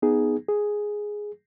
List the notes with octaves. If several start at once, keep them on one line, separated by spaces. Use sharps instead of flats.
B3 D#4 G#4
G#4